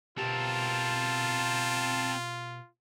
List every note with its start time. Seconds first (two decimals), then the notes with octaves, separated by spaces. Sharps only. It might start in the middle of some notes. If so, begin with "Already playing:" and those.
0.18 B2 C4 F4 G4 A#4 A5